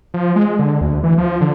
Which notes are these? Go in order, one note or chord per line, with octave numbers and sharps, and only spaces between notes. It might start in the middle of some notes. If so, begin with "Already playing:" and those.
F3
G#3
D3
D2
E3
F3
D3